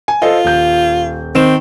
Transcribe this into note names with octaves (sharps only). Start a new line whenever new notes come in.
G#5
F4 A4 C5 D#5
D#1 G6
D#3 C4 E7